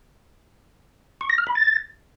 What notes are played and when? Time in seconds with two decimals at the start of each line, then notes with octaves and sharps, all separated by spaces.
1.21 C#6
1.30 A#6
1.38 F6
1.47 B5
1.55 A6